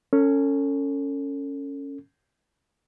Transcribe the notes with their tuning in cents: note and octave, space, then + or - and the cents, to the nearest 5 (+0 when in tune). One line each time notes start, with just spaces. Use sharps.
C#4 +0 A4 +35